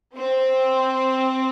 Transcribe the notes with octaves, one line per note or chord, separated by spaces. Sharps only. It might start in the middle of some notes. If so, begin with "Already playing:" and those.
C4